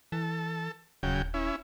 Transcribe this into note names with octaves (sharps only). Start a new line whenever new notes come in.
E3 A4
D#1 C#3 F#3 G5
C#4 E4